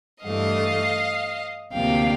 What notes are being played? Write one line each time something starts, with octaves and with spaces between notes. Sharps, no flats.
G2 E3 A3 D#5 F5
D2 C3 F3 A#3 F5 G5